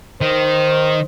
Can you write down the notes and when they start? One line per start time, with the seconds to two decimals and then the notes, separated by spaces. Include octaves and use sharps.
0.21 D#3 C5